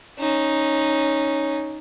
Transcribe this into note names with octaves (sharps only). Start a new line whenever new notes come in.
C#4 D#4